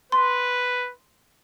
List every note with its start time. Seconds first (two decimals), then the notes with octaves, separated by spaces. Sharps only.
0.12 B4 C6